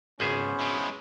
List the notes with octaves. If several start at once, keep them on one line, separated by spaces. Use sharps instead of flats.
G#1 C#2 G#2 B3 C#4 G#4 C5 E5
G#3 E4